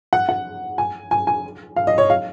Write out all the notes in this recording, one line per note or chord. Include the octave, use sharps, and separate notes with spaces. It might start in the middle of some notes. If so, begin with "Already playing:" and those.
F#5
F#5
G#5
G#5
G#5
F5
D#5
C#5
F5